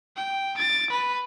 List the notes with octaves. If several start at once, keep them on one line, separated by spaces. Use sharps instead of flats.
G5
A6 D7
B4